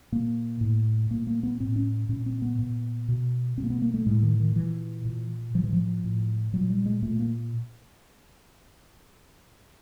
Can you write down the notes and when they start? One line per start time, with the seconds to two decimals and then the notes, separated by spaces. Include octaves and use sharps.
0.12 A#2 A#3
0.61 A2
1.11 A#2 A#3
1.27 A#3
1.43 B3
1.60 A2 C4
1.76 C#4
2.09 A#2 C#4
2.26 C4
2.42 B3
2.59 A#2
3.08 B2
3.58 B2 C4
3.64 A#3
3.70 B3
3.82 A#3
3.94 A3
4.06 A2 G#3
4.23 D#3
4.40 D#3
4.56 A#2 E3
5.05 A#2
5.54 A2 F3
5.64 E3
5.73 F3
6.04 A2
6.53 A#2 F#3
6.70 G3
6.86 G#3
7.02 A#2 A3
7.19 A#3